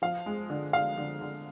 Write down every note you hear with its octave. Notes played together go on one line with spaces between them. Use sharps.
F3 F5
G#3
D3
D3 F5
D3
D3